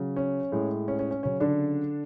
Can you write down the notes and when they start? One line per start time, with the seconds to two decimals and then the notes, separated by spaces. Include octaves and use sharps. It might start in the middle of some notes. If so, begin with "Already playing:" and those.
Already playing: C#3 F#3
0.16 C#4
0.52 A2 G#3
0.88 C#4
0.99 C#4
1.11 C#4
1.23 C#3 F#3 C#4
1.40 D3 D4